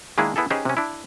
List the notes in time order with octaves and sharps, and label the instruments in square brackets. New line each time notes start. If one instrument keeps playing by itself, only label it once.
[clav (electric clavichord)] D#3 G#3 A#3 D4 E4 G#4
B3 E4 G#4 A4
C#4 D#4 G4 G#4 B4 C5
C3 C#4
D4 E4